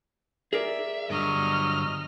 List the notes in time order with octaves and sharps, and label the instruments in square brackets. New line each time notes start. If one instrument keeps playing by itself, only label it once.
[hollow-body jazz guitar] G#4 A#4 D5 [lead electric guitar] E5
[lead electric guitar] G2 D3 [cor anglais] F#3 [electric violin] D#5 F6